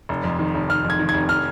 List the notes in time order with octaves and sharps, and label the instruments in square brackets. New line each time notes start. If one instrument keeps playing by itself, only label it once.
[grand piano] F1
F2
D#3
F1
F1 F6
F2
G#6
D#3
G#6
F1
F6